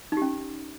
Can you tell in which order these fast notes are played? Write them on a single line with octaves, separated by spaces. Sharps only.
D#4 G4 C#4